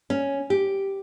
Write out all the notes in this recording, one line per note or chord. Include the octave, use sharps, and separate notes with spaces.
C#4
G4